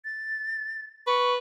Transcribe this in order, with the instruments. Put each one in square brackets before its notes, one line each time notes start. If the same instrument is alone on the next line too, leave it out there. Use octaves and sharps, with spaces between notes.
[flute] A6
[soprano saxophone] B4 [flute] C#6